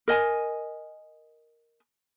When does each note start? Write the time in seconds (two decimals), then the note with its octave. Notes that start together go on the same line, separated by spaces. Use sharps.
0.08 A#4 D#5 G#5